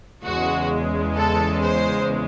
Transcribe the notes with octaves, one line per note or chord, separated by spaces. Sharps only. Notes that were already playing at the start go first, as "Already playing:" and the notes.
E2 C#3 G#3 F#4
A4
C5